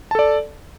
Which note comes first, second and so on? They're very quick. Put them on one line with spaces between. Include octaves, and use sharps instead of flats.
A5 A4 D5